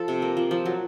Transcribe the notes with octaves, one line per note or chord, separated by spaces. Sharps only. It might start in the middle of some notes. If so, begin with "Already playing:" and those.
Already playing: F3 A4
C3
A#3
F3
F3
F#3